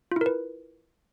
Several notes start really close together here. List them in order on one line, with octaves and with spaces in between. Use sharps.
F4 E4 A#4 B4